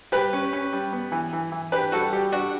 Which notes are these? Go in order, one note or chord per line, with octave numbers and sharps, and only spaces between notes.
G3 G4 B4
C#4
C#4
G3
B3
E3
E3
E3
D4 G4 B4
G3 F#4 A4
G3 G4
D4 F#4